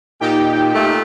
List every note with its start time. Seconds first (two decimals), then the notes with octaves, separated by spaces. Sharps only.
0.20 A#2 D#4 G4 G5
0.74 A#2 A3